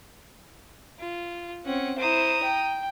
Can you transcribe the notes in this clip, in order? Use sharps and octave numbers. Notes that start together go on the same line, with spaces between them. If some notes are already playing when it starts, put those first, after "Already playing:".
F4
C4 C#4 F#5
E4 C5 A#5 D#6
G5